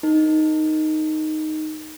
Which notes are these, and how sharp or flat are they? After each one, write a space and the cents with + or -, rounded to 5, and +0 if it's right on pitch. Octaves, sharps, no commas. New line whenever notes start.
D#4 +0 A#4 +0